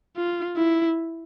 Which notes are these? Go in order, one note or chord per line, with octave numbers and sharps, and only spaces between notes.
F4
E4